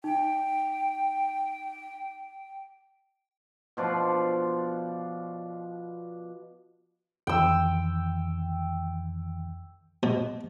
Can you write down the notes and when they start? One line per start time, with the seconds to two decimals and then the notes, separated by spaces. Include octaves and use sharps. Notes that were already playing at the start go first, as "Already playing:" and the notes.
0.04 D#4 G5
3.77 B2 F3 D4 D5
7.27 F2 D#3 E3 G5 E6
10.03 B2